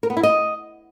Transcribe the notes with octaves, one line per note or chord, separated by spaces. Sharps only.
A#4
B3
E4
D#5